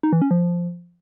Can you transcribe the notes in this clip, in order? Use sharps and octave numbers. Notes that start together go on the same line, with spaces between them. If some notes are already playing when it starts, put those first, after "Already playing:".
D#4
E3
C#4
F3